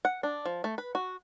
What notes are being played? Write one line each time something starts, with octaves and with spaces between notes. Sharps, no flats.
F#5
D4
F3
A3
B4
F#4